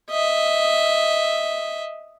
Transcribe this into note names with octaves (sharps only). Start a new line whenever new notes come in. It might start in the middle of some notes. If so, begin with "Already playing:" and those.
D#5 E5